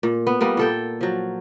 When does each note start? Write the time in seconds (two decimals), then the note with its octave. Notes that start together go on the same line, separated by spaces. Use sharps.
0.03 A#2
0.27 B3
0.41 G3 A#3 B3
0.57 A#2 A4 G5
1.01 F3 F#3